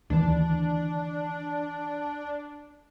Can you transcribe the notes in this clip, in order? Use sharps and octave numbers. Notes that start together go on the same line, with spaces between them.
D2 D#3 E3 D4